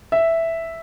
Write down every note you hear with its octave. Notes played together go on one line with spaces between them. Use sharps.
E5